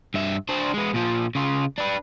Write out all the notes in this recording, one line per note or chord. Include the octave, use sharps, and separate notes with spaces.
G2 E5
D4 C5
G#3 B3
A#2 F3
C#3 F4
D4 B4